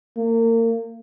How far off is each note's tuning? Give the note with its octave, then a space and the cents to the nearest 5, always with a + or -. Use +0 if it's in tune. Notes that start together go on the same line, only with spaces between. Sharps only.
A#3 -35